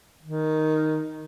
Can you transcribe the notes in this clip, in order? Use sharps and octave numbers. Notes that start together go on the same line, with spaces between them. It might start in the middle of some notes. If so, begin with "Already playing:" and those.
D#3